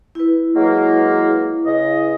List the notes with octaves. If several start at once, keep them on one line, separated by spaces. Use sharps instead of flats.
E4 B4
F#3 G#3 A#3
C#3 D#5